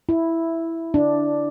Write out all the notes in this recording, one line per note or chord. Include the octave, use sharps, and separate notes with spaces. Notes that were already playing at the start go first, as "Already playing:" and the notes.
E4
D4